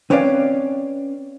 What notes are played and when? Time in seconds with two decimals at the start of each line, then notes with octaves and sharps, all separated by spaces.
0.10 C4 C#4 B4 C#5 D5 F5